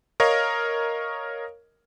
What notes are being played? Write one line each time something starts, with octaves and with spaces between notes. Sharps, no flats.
A#4 C#5 D#5 F5